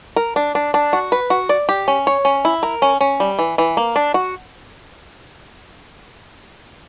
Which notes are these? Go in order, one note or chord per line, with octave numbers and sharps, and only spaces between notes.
A#4
D4
D4
D4
F#4
B4
F#4
D5
G4
C#4
C#5
C#4
E4
A#4
C#4
C#4
G3
E3
E3
A#3
D4
F#4